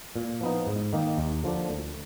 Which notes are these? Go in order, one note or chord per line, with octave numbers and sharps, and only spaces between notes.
A#2
F3 B3 D#4
G#2
D#3 A#3 D#4
D#2
D3 F3 A#3 D4
D2